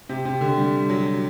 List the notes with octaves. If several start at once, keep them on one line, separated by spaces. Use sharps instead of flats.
C3
C3
D3
G3
F#3